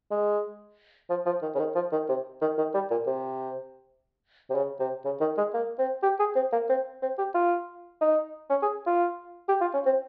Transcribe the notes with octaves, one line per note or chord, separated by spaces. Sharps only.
G#3
F3
F3
D#3
C#3
D#3
F3
D#3
C3
D#3
D#3
G3
A#2
C3
C3
C#3
C3
C#3
D#3
G#3
A#3
C4
G4
G#4
C4
A#3
C4
C4
G4
F4
D#4
C#4
G#4
F4
G4
F4
C#4
C4